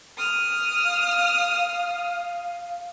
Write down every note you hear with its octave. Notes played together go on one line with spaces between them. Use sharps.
D#6 F6
F5